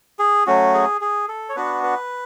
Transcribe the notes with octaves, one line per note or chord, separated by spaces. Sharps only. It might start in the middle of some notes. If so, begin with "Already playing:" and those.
G#4
F#3 A3 C#4 F#4
G#4
G#4
A4
C#5
B3 D4 F#4 B4
B4